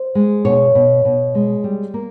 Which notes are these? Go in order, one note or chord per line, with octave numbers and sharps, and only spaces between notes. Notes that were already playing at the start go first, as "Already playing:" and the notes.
Already playing: C5
G#3
B2 C#5
B2
B2
G#3
G3
A#3